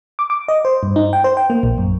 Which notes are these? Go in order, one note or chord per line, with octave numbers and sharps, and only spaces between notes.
D6
D6
D#5
C5
G2
D#4
G5
C5
G5
A#3
A#1
F#2